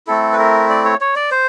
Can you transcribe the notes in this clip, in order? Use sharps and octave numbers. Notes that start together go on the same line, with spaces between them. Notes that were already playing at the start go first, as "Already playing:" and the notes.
A3 C4 E4 A4
B4
A#4
D5
C#5
C#5
D5
C5